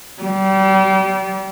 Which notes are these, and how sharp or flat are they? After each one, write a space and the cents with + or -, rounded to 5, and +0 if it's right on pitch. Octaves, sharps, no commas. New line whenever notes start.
G3 -30